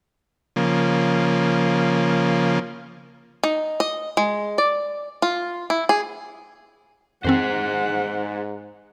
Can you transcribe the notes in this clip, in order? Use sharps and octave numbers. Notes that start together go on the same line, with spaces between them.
C#3 F3 A#3
D#4
D#5
G#3
D5
F4
E4
G#4
F2 G#2 D#3 C4 G#4 C5 F#5